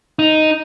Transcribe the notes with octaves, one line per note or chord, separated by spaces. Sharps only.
D#4